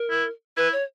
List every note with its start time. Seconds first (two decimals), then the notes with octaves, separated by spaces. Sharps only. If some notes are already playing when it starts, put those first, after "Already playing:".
Already playing: A#4
0.10 E4
0.57 E4 B4
0.72 C#5